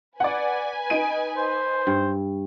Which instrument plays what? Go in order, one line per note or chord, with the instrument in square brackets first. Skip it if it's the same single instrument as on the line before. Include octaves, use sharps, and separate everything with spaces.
[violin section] B4 G#5 [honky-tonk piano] D5 F#5
[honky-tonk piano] D#4 D7 D#7
[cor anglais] C5
[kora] G2